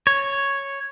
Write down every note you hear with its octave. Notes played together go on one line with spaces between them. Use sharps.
C#5